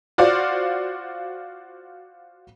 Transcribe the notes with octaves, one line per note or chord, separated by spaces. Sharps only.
F4 F#4 C5 D5 F5